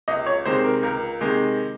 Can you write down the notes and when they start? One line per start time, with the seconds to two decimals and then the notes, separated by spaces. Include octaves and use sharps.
0.08 C#2 D#5
0.26 C#5
0.46 C3 D#3 G#3 C5
0.64 A#4
0.83 C#2 A#4
1.21 C3 D#3 G#3